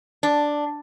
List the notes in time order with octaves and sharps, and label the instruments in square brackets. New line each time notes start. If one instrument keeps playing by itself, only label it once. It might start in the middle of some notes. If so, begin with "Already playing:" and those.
[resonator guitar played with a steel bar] D4